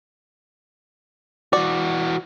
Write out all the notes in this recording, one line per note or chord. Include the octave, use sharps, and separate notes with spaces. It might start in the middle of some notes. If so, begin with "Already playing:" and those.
E3 F#4 D5